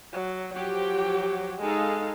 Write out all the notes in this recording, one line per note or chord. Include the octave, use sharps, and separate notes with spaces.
F#3
F3 F#3 G4 G5
G#3 D#4 A4 F5